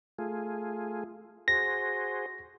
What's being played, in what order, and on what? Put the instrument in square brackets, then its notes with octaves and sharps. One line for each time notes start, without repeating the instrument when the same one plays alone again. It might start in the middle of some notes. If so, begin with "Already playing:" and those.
[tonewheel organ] A3 F4 G#4
[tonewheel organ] F#4 G#4 C5 [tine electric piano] A#6